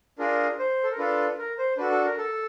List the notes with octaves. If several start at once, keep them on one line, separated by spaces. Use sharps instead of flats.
D4 F4 G#4 A#4
C5
A4
A#4
D4 F4 A4 B4
A#4
C5
D4 F#4 A4 B4
A4
A#4
A4